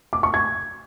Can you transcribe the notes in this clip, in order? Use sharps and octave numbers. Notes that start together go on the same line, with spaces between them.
D6
C#6
G#6